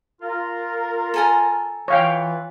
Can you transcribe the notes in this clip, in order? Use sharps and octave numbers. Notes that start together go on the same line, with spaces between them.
F4 A#4
A4 G#5 A#5
E3 F4 B4 C#5 F5 G5